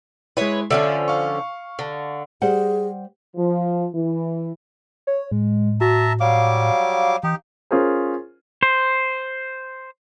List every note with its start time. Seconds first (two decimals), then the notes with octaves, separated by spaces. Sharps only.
0.37 G#3 E4 B4 C#5
0.71 D3 F3 C#4 A4 D5 E5
1.08 F5 C#6
1.79 D3
2.42 G3 G#4 C5 F#5
3.36 F3
3.93 E3
5.07 C#5
5.32 A2 G#3
5.81 F#4 E5 A5 A#5
6.20 F#3 G3 F5 D6
7.23 E3 D#4 G4
7.71 C#4 F4 G#4 A#4 C5
8.63 C5